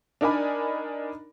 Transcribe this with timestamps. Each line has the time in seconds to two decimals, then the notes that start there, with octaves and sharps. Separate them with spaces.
0.21 D4 D#4 A#4 D5 G#5 B5